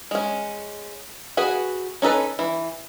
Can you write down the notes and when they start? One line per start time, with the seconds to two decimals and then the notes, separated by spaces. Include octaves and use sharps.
0.11 G#3 C#4
1.37 F#4 G#4 B4
2.02 C#4 D#4 A4 B4
2.39 E3